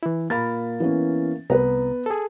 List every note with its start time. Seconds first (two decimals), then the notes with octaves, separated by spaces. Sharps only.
0.03 E3 E4
0.30 A#2 A#3 A#4 F5 B5 A6
0.80 E3 B3 C#4
1.50 C2 B3 B4 A#5
2.06 G#4 A4